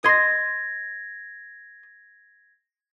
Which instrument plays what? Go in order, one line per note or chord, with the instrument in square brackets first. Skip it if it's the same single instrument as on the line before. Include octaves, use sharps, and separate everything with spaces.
[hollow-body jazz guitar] D#5 C6 [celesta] G#6 A#6